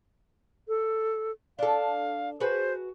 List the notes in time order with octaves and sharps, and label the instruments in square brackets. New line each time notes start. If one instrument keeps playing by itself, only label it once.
[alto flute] A4
[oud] D4 A4 [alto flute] F5
[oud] F#4 G#4 B4 [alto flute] C5